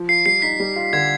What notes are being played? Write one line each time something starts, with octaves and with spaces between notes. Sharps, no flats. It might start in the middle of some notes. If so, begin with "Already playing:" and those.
Already playing: F3
F4 C7
G3 C7
D#4 B6
G3
F4
D3 G#6